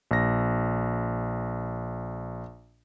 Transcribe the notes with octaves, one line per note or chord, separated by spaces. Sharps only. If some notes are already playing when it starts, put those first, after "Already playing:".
A#1 A#6